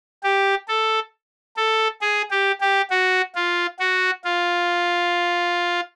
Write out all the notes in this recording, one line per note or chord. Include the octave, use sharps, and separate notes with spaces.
G4
A4
A4
G#4
G4
G4
F#4
F4
F#4
F4